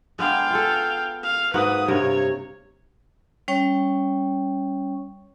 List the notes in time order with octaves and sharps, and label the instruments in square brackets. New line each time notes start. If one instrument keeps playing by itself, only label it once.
[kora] G#3 B3 D4 [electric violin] F5 G5
[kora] F4 G#4 A4
[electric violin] F5
[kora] G#2 A#3 F#4 [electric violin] B4 D#6
[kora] G2 C3 A#4 [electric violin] C#5
[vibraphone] G3 C#4 C#5 G5 C#6